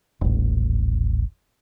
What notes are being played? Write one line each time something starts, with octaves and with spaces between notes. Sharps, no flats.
D#1 A1